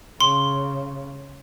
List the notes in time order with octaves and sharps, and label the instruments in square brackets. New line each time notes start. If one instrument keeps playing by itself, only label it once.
[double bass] C#3 [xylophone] C6